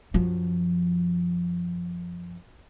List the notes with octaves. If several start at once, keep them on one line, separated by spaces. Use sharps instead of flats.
F#2 F3